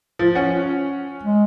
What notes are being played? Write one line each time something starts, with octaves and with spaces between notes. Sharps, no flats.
F3
C#4 F#5
G#3